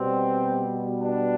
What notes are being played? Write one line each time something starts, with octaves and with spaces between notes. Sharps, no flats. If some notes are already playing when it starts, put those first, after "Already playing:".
Already playing: B2 G3 C4
D4